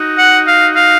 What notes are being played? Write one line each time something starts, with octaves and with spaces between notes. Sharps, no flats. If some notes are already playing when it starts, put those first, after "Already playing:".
Already playing: D#4 F#4
F#5
F5
F5